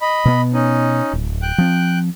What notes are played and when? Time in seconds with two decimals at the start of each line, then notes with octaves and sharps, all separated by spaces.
0.01 D#5 B5
0.25 B2 B3
0.54 C#4 D#4
1.13 D1
1.42 G5 F#6
1.58 F3 C4